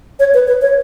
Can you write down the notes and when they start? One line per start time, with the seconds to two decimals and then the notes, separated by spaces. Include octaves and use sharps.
0.19 C#5
0.34 B4
0.48 B4
0.62 C#5